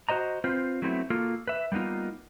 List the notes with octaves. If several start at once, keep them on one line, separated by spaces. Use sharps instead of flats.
F#4 C5 D#5 A#5
C4 F4 B4 C5
F#3 A3 B3 C4 E4
A#3 F4 F#4 A4
B4 E5
G3 A#3 B3 D#4 F4